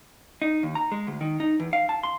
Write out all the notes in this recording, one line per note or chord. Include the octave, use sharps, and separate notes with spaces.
D#4
D#2
A#5
G#3
D2
D#3
D#4
E2
F5
A5
C6